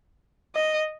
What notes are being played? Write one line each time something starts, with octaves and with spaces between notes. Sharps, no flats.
D#5